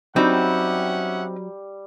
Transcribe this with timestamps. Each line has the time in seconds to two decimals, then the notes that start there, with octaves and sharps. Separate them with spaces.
0.16 F#3 G3 C4 C#4 D#4 E5 F#5